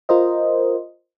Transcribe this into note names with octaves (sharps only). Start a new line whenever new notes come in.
F4 A#4 C5 D#5